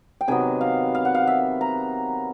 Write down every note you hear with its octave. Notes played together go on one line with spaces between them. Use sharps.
G5
C3 D#3 F#3 B3 G#5
F5
F5
F#5
F5
E5
A#5